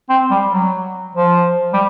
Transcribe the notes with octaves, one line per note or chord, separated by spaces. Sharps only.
C4
G3
F#3
F3
G3